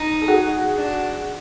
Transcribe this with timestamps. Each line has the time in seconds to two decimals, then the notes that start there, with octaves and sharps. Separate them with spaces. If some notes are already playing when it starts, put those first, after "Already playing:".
Already playing: D#4
0.22 A4
0.28 F#4 G#4
0.75 D4